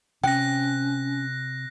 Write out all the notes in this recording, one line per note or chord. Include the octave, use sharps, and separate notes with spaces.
C3 C#4 G5 F#6 A#6